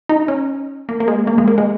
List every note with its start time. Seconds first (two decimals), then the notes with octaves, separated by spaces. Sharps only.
0.09 D#4
0.28 C#4
0.89 A#3
1.00 A#3
1.08 G#3
1.27 A#3
1.38 G#3
1.48 A#3
1.58 G#3